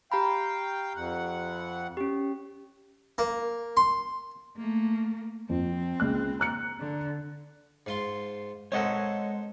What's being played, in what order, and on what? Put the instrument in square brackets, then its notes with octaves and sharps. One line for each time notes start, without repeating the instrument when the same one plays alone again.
[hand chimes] G4 A#5 B5 [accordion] F5 G5
[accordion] F2 F#5
[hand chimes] C#4 G4
[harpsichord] A#3
C6
[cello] A3 A#3
[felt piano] F2 [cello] C4
[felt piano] C#2 F#6
A#5 F#6 C#7
[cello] D3
[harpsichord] G#2 F4 C6
[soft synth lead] G#3 [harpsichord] C4 A4 A#4 [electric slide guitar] C#5 D#5 F#5